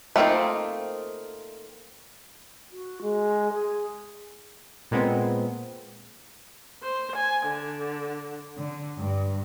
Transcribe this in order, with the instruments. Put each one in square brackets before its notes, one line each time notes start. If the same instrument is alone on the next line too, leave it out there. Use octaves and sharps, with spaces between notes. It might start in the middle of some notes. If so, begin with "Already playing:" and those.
[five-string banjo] A3 A#3 C4 D#4 F4
[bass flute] F#4
G#3
G#4
[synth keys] A#2 G#3 B3 C4
[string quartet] C5
G#5
D3
D3
G2